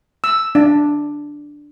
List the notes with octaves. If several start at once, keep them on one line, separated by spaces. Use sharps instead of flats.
E6
D4